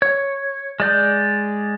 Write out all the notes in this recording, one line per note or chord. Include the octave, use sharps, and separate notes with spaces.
C#5
G#3 D5 G6